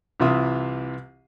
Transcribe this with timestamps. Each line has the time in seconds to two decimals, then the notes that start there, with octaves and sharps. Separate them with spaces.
0.20 C2 C3 E3 F4 E5 D#6